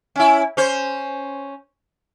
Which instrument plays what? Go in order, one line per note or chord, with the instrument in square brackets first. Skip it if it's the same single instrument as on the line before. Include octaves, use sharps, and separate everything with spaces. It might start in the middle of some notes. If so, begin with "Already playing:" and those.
[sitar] C#4 E4
C#4 C5